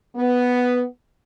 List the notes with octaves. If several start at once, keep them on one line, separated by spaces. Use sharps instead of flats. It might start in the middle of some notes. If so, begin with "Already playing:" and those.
B3